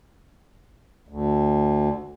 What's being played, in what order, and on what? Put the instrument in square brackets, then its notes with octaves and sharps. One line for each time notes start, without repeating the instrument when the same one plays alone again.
[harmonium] D2